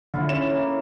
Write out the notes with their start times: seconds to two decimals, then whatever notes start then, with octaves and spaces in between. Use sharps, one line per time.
0.14 A2 D3 E4 F4
0.29 E3 C#4 E7
0.48 E3 A#3